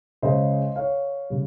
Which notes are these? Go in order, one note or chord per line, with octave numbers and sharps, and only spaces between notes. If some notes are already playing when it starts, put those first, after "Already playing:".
C#3 G#3 C5 D#5
C#5 F5
C#3 G3